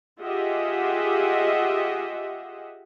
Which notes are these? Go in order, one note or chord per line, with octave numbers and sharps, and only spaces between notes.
F4 G4 G#4 D#5 E5 F#5